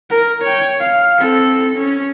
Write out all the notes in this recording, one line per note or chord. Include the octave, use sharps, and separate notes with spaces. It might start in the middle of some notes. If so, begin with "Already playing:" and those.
A#4
C#5 G5
F5
C4 A4
C#4